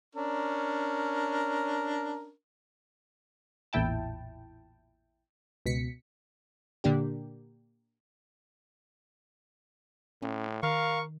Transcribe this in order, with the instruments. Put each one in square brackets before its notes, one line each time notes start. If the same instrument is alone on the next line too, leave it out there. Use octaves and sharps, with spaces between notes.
[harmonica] C#4 D4 A#4
[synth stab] A1 E2 A#2 E4 G5 A5
C#2 B2 B6 C#7
A#2 D3 A#3 D4 G4
[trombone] A2 [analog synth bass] C#4
[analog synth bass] D#3 [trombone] A#4 [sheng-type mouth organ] F5 [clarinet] C#6